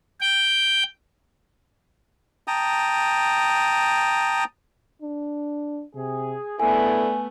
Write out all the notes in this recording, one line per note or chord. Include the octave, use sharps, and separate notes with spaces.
G5
G5 A5 A#5 D#6
D4
C3 G#4
C#3 A3 B3 D4 E4 A4 G#5